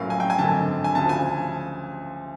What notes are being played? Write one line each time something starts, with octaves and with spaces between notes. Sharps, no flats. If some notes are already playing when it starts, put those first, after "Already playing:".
Already playing: A#1 A2 F#3 A#3 C#4 F5
G#5
G5
G#5
G#1 F#2 D3 A5
G#5
D2 C#3 F3 A5
G#5